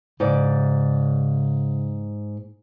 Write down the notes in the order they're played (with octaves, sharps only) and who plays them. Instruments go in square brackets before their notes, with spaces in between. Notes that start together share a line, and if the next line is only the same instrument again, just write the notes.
[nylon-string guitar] G#2 D5 [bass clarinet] C#3